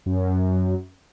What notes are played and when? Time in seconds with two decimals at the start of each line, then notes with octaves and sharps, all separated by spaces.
0.06 F#2